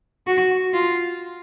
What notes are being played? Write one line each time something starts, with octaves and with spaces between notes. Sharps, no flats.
F#4
F4